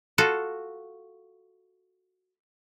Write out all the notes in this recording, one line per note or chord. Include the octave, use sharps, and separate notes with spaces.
F4 F#4 A4